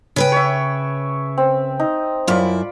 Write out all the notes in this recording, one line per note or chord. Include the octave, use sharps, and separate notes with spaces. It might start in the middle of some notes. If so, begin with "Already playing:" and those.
C#3 B4 G5
C#5 E5
C4
D#4
F#2 E4 F4 D5 B5